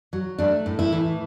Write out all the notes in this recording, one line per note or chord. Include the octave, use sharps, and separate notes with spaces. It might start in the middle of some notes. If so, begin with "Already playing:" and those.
F#3
A3 D4
A2
E4
E3